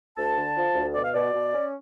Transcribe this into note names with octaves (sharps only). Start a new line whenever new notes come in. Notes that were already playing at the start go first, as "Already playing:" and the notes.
D2 A5
D3
F3
D2
B2 D5
F5
B2 D5
B2
C#4